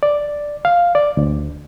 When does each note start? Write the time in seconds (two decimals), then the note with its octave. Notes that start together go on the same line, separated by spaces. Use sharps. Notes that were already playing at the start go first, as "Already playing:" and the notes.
0.03 D5
0.65 F5
0.95 D5
1.17 D2